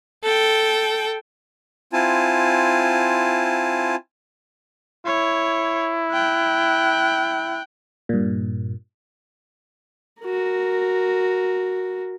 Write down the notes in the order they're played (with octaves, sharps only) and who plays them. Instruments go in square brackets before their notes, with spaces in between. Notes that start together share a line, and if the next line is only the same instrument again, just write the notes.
[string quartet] A4 G5
[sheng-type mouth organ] C4 E4 F4 G#5 A5
[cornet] E4 [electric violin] C#5
[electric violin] G5 F#6
[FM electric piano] G2 A#2
[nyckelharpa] F#4 A#4